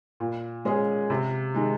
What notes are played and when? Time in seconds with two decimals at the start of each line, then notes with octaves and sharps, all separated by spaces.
0.20 A#2
0.65 G#3 C#4 G#4
1.10 C3
1.54 D#3 G#3 D#4